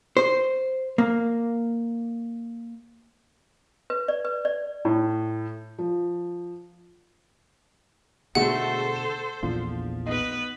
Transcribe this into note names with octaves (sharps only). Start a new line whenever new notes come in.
C5
A#3
B4
D5
B4
D5
A2
F3
B2 D3 G#3 A3 F#4 A4 C5 F#5
E7
A#1 E2 F3 D4
B3 D#4 B4